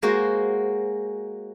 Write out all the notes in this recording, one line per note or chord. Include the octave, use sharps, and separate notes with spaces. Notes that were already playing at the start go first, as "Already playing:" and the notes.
G#3 A#3 F#4 C5